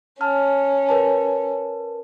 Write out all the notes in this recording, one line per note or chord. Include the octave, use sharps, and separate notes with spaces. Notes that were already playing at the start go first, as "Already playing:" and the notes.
C#4 A5 F6
A#4 B4 A5